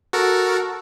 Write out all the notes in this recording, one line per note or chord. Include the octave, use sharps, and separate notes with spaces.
F#4 A4 A#4